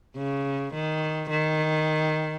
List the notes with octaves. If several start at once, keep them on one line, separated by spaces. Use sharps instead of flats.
C#3
D#3
D#3